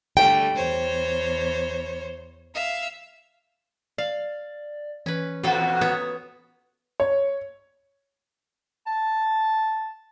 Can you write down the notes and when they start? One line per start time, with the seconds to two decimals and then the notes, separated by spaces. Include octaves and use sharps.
0.17 D3 G3 A3 G5
0.54 E2 C5 C#5
2.55 E5 F5
3.98 D5 F5
5.06 E3 C#4 B4
5.43 E2 B2 F4 F#4 A4
5.81 B3 C#5 A5 D#6
7.00 C#5
8.87 A5